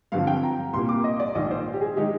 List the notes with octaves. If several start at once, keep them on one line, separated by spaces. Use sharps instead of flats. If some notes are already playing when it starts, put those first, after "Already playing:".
G2 D3 F3 C4 F5
G5
A#5
C2 A#2 G3 A#3 C6
D6
D#5
D5
A#1 G#2 D#3 D#5
C5
G4
G#4
D#3 G#3 D#4 G4